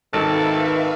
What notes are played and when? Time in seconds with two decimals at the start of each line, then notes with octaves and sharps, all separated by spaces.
0.13 G#1 D#3 A4 B4 E5 F5